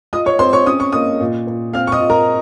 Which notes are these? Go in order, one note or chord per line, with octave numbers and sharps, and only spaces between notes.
F4 D#5 D#6
C#5 C#6
C4 C5 C6
C#5 C#6
C#4 D#6
C#6
A#3 D#5 D#6
A#2
A#2
C4 F5 F6
C#6
D#5 D#6
F4
A#4 A#5